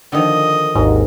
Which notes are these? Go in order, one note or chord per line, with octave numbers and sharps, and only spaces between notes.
D3 D#3 F3 D#5
G#1 D#2 G#2 A#4